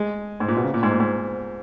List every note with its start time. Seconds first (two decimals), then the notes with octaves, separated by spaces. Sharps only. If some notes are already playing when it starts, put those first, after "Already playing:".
Already playing: G#3
0.40 G#2
0.48 A#2
0.56 B2
0.64 C#3
0.74 A#2
0.83 G#2
0.91 A#2
1.00 G#2